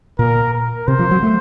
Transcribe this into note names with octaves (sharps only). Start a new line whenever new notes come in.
A#2 A#4
A#4
C3 C5
F3
F#3
A3